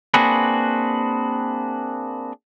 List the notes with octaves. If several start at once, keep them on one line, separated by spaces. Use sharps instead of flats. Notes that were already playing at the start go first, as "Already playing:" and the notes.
A#3 C4 D4 F#4 G#4 B4